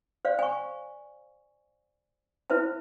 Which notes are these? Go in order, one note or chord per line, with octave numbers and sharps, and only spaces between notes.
C5 D5 F5
G#5 C#6
E4 F4 B4 C5 E5 A5